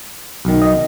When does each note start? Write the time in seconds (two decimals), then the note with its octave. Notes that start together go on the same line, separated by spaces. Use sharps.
0.45 B1 D#3
0.62 D#5